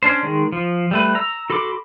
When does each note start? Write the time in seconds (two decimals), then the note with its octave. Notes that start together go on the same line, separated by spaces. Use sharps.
0.03 C#4 D4 C5
0.23 D#3 G#3
0.52 F3
0.91 G3 A3 B4
1.15 A#5 E6
1.50 F#4 A4 B5 C6 D6